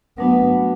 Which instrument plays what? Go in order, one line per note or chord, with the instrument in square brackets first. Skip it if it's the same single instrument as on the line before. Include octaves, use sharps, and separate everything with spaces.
[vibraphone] F#3 A3 D4 F#4 [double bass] B3